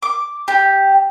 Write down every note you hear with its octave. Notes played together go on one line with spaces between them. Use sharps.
D6
G4